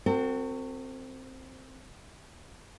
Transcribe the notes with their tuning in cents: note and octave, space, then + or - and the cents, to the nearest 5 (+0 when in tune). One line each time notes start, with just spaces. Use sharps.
C4 +0 F#4 +0 A#4 -45